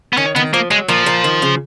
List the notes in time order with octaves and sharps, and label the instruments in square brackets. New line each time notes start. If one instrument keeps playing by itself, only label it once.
[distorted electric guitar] B3
[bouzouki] D#3 [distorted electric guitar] C#4
[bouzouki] D#3 [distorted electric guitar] B3
[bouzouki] F3 [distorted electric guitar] A#3
[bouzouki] F#3 [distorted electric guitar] G#3
[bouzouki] A#2 A#3 [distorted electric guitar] F3
[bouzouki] A#2 A#3
D#3
C#3